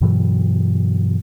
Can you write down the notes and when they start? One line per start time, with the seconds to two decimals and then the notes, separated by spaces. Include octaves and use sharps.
0.01 G2 B2 E3 F#3